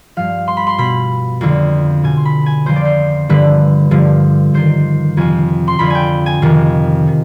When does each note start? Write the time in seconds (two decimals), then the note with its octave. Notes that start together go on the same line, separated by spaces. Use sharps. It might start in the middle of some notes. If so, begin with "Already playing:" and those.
0.16 G2 F3 F5
0.48 C6
0.57 B5
0.67 C6
0.78 B2 B5
1.41 F2 D3 F3
2.03 B2 G#5
2.17 C6
2.25 B5
2.46 G#5
2.66 F2 D3 F3 C5
2.76 D5
2.85 C5
3.29 G2 D3 F3 B4
3.91 G2 D3 F3
4.54 G2 D#3 C5
5.17 F2 C3 F3 G#5
5.68 C6
5.79 F2 D3 F3 B5
5.90 G5 G#5
6.26 G#5
6.42 F2 C3 D#3
7.07 D#3